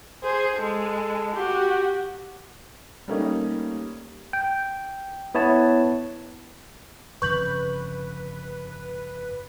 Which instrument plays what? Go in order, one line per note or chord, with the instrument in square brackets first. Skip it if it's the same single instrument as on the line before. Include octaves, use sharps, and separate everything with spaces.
[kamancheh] G#4 [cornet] C5
[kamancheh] G#3 [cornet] A4
[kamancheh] F#4 [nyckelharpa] G4
[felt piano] G3 A3 A#3 C#4 D#4
[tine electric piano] G5
B3 E4 C#5 A5
[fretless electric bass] G1 F2 C#3 [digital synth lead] B4 [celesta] C#6 G6 F#7